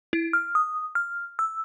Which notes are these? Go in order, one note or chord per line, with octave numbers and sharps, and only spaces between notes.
E4
F6
D#6
F6
E6